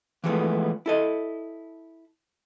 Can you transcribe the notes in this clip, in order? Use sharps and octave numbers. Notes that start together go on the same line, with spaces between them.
E3 F3 G#3 A3 B3
E4 A4 D#5